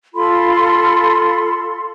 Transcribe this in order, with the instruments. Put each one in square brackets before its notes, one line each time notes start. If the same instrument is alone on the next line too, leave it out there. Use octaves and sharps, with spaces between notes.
[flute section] F4 A4 B5 C6